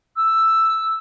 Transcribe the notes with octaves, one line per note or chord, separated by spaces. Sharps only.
E6